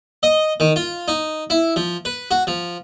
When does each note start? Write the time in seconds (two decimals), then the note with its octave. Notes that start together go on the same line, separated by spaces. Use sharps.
0.23 D#5
0.60 D#3
0.76 F4
1.08 D#4
1.50 E4
1.76 F3
2.05 B4
2.31 F#4
2.47 F3